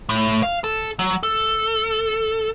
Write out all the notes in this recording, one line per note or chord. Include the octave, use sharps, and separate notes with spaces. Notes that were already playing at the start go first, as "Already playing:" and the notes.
A2
F5
A4
F#3
A4